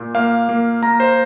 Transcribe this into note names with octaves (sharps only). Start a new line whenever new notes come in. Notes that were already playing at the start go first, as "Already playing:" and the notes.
Already playing: A#2
A#3 F5
A#3
A#3 A#5
C5